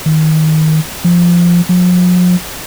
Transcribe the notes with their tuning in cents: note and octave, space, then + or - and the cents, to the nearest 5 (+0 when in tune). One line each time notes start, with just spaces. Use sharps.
D#3 +15
F3 -5
F3 +45